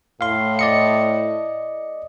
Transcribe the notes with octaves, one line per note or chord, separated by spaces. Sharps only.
A2 F5 C6
D5 D#5 C#7